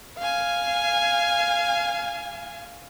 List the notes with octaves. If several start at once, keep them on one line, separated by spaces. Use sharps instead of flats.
F5 G#5